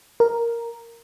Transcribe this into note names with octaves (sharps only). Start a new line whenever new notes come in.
A#4